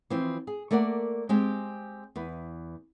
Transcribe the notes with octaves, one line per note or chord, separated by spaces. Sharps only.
E3 F3 C4
G#4
A3 A#3 A#4 D5 F#5
G#3 C4 G4 G#5
E2 B4